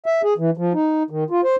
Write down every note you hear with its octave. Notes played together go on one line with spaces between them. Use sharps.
E5
G#4
E3
F3
D#4
D#3
F4
C5